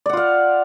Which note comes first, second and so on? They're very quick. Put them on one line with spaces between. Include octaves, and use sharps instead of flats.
D5 F#5 F4 F5